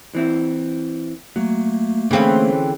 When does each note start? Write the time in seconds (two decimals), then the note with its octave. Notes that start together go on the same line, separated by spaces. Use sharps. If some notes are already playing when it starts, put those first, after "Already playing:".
0.15 E3 C4 E4
1.36 F#3 A3 A#3
2.11 D3 E3 C4 C#4 G#4 F5